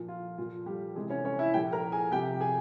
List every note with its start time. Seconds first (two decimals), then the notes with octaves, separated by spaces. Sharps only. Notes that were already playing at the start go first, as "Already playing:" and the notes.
Already playing: A#2 F3
0.08 F4
0.38 A#2 F3 F4
0.66 G3 G4
0.95 C3 E3 G#3 G#4
1.10 C#4 C#5
1.25 C#4 C#5
1.39 E4 E5
1.54 A#2 F3 G4 G5
1.72 A#4 A#5
1.92 G#4 G#5
2.12 C3 F3 G4 G5
2.40 G#4 G#5